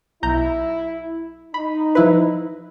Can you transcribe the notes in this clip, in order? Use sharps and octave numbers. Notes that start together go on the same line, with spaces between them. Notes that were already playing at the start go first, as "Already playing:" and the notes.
B1 E4 A#5 G6
D#4 B5
F3 E4 B4